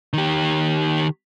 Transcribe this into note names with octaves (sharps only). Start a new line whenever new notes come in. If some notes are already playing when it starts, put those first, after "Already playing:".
D#3 G4